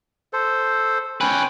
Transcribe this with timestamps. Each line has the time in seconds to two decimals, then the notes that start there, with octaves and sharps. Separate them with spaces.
0.33 A4 C5
1.21 C#4 B4 G5 G#5